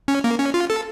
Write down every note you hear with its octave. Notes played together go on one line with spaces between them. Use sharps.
C#4
A#3
C#4
F4
A4